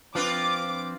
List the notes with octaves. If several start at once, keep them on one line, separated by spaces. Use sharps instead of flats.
F3 C4 D4 F4 B4 D6